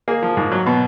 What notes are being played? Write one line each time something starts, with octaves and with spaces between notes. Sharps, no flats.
A#3 G#4
F3
G#2
F#3
B2